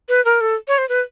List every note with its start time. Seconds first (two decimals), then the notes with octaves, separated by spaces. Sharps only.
0.09 B4
0.25 A#4
0.41 A4
0.68 C#5
0.78 C5
0.89 B4